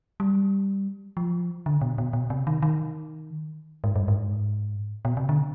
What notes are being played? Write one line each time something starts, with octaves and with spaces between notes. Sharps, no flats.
G3
F3
D3
B2
B2
B2
C3
D#3
D#3
G#2
G2
G#2
B2
C3
D3